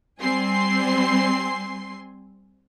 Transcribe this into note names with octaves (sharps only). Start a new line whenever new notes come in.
G3 C4 G#5 C6 C7